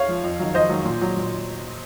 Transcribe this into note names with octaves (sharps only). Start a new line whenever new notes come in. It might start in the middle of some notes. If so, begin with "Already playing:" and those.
Already playing: C#5 F5
F3
F2
D#3 F#3
F2 C5 D#5
D#3 F#3
A#2
F#3
A#2